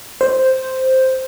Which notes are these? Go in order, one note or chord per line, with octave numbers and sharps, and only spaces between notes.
C5